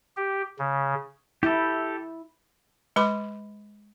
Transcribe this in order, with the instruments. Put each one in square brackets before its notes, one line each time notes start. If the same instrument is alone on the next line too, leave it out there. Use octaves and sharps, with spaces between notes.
[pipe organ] G4
C#3
[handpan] E4 [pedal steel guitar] G4 A4
[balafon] G#3 B4 B5 C6 D6